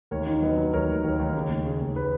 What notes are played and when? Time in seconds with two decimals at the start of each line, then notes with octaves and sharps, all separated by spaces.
0.11 D#2 A#4 C#5
0.27 D#3
0.42 F#3 B4 D#5
0.57 F#3
0.73 D#2 A#4 C#5
0.88 D#2
1.04 D#2
1.19 D#2
1.35 C#3
1.50 D#2
1.65 C#3
1.81 D#2
1.96 B4